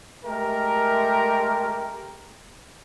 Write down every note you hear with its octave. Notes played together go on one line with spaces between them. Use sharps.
G#3 A3 G4 A#4